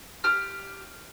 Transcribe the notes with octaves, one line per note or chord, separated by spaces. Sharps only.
G4 F6